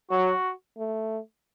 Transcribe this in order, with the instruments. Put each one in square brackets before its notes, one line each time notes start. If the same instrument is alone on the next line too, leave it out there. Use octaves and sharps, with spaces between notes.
[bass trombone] F#3 [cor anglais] F#4
[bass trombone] A3